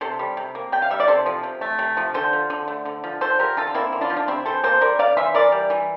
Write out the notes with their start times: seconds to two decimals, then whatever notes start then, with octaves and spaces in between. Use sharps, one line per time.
0.01 C3 A4 C5
0.19 G3
0.37 C3
0.55 A#3
0.72 C3 G5
0.82 F5
0.90 G3 E5
1.00 D5
1.08 C3 A4 C5
1.26 F3
1.43 C3
1.61 A3
1.79 C3
1.97 F3
2.14 D3 A4 C5
2.33 F3
2.50 D3
2.68 A3
2.85 D3
3.04 F3
3.21 D3 A4 C5
3.39 F3 G4 A#4
3.57 D3 F4 A4
3.67 F4
3.75 A#3 C4 E4
3.92 D3
4.01 D4 F4
4.10 F3
4.17 D4
4.28 C3 C4 E4
4.46 E3 A4 C5
4.64 A#3 A4 C5
4.81 G3 A#4 D5
4.99 C3 D5 F5
5.17 E3 C5 E5
5.34 E3 A#4 D5
5.52 G3
5.70 E3